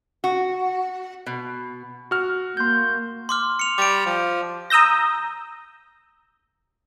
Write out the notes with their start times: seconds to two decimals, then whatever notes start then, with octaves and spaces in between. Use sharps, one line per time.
0.24 F#4
1.26 B2
2.11 F#4 F6
2.57 A#3 C6 G6
3.29 C6 D6 F6
3.59 C#7 F7
3.78 G3 D6 D7
4.06 F3
4.70 A#5 D#6 E6 G6 A#6